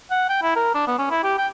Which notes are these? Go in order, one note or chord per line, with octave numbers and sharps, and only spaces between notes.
F#5
G5
E4
A#4
D4
B3
C#4
E4
G4
G5